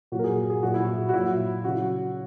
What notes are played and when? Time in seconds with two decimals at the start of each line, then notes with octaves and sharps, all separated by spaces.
0.12 A#2 F#3 F#4
0.19 A#4
0.24 G#4
0.50 G#4
0.63 A#2 F#3 F#4
0.74 E4
0.84 F#4
1.09 F#4
1.13 A#2 F#3 E4
1.64 C#3 F#3 F#4